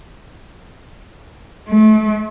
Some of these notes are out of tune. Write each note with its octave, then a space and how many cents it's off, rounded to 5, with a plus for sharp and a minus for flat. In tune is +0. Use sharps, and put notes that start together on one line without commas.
A3 -35